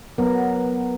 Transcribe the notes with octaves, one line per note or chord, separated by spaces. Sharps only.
F#3 B3 A#4